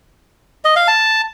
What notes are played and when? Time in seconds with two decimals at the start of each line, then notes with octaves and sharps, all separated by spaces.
0.64 D#5
0.76 F5
0.88 A5